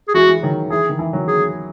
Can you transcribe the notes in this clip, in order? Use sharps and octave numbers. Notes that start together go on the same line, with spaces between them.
G#4
E3 G#3 F#4
E3
D#3 F#3
E3 G#4
D#3
E3
D#3 F#3
G#4